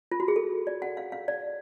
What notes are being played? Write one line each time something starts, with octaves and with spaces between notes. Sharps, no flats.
F4
F#4
G#4
A4
D5
F#5
F5
F5
D5